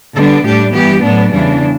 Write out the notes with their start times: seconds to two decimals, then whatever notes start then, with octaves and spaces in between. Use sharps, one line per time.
0.16 D3 G3 B3 D4 A4
0.46 A2 G3 D4 G4
0.75 G2 E3 B3 G4
1.04 A2 F#3 B3 D4
1.33 E2 C#3 E3 G3 D4